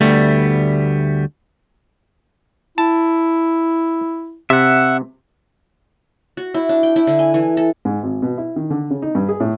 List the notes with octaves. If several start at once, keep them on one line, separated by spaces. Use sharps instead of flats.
D2 G3 A3 B3
E4 A5
C3 E5 F#5
F#4
E4
D4
G5
E4
D3
G#5
E3
A4
G#2
G#1
B2
E4
D#3
D3
C#3
D#4
G2
G#4
A2